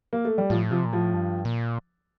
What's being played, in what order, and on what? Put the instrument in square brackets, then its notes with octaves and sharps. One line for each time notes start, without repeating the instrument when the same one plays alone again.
[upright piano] A#3
A3
G3
[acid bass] A2 [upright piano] F3
[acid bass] C3 [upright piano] F3
[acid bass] A#2
[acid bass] A2 [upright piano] F3
[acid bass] G2
A#2